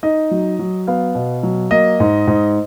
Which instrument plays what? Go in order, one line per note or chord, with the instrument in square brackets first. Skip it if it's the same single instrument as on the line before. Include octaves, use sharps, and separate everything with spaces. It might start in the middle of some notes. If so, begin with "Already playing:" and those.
[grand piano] D#4 D#5
F#3
F#3
B3 F5
B2
F#3
A#3 D#5
G#2
G#2